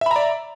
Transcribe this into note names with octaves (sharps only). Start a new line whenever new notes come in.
D5 E5 A#5 B5